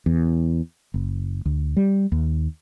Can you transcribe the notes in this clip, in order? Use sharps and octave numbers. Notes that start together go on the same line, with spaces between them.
E2
F#1
D2
G3
D#2